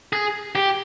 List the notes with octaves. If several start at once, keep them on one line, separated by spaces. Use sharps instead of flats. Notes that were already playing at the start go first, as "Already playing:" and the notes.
G#4
G4